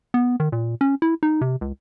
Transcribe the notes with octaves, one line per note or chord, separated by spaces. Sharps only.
B3
D#3
A#2
C#4
E4
D#4
C3
C#2